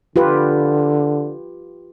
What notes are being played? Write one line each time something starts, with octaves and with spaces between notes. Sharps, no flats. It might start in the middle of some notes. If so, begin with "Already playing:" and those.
D3 F4 G4 B4